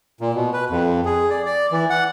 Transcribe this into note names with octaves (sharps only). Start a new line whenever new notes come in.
A#2
B2
B4
F2
G#4
D5
D5
E3
F#5